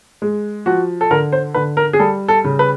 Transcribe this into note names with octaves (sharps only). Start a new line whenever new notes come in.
G#3
F3 F#4
A4
D3 A#4
C5
D3 B4
A#4
G#4
G3 A4
A4
C#3
B4